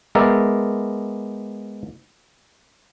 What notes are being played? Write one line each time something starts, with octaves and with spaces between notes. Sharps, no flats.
G#3 B3 A#4 D5 E5